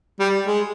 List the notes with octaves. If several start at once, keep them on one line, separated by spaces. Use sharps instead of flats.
G3
G#3